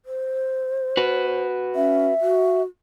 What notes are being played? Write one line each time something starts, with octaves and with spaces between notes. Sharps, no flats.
C5
F#4 B4
C#4 E5
F#4